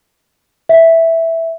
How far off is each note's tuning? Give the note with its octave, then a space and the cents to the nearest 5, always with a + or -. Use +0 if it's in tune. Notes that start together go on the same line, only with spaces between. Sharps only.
E5 +0